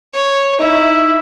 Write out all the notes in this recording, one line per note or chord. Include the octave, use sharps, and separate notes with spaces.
C#5
D#4 E4 D#5 E5